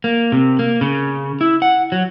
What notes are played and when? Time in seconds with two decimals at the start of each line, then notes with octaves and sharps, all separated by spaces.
0.04 A#3
0.32 C3
0.59 A#3
0.81 C#3
1.41 E4
1.62 F#5
1.92 F#3